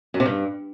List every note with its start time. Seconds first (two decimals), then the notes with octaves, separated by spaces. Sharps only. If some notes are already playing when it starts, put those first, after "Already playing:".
0.14 F#2
0.20 C3
0.26 G2